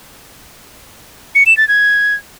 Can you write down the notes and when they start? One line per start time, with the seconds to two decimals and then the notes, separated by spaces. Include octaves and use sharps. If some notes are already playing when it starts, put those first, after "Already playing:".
1.35 C#7
1.46 E7
1.57 A6
1.68 G#6